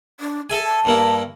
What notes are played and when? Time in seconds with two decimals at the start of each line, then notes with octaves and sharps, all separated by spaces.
0.20 D4
0.50 G#4 A4 E5 G#5
0.64 A5
0.85 G2 A#3 E4